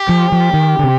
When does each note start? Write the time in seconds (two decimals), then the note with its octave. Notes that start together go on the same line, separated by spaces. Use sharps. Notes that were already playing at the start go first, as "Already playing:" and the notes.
Already playing: G4
0.09 F3
0.32 F3
0.53 D#3
0.79 D3
0.84 C3